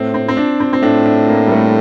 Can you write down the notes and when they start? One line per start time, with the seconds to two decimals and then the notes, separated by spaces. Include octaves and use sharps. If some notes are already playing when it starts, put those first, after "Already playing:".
Already playing: A2 C4
0.14 C4
0.28 C4
0.37 D4
0.60 C4
0.73 C4
0.82 A2 D4
1.06 D4
1.29 A#3
1.47 G3
1.52 A3